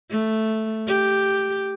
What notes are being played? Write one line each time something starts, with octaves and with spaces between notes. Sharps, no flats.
A3
G4